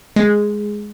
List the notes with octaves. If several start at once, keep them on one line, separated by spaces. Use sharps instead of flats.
G#3